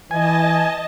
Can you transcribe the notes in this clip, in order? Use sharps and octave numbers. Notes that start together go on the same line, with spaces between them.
E3 D#5 G#5 A5